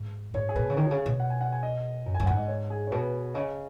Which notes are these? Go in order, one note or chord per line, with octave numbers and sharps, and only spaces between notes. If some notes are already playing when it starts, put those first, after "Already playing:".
Already playing: G#2
G#2 C#5
G#4
B2 B4
C#3
D#3 C#5
B2
C#3
B2
F#5
G#5
F#5
G#5
D#5
F#2
G#5
F#2
G#2 F#5
D#5
C#5
G#4
C#5
B2 B4
C#3 D#5